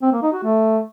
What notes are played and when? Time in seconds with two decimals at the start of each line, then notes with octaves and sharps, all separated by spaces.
0.02 C4
0.12 A#3
0.23 D#4
0.33 F#4
0.43 A3